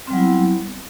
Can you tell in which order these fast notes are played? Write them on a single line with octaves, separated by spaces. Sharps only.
C4 G3 F#3 E4 B3